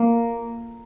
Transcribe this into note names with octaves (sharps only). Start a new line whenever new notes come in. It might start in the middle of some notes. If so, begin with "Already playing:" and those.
Already playing: A#3